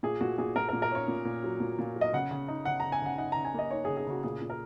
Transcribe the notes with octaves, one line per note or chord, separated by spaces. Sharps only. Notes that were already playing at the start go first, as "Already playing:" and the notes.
A#2 G#4
A#2 F#4
A#2 G#4
A#2 A#4
A#4
A#2
A#4
C#4 C#5
A#2
A#2
F#3
A#2
A#2
F#3
D#5
C#3 F#5
C#3
D#4
C#3 F#5
A#5
C#3
G#5
C#3 F#5
D#4 F#5
C#3 A#5
G#5
A#3 D#5
D#4 C#5
G#4
C#3
G#4
C#3 F#4
A#2 G#4
A#2
A#4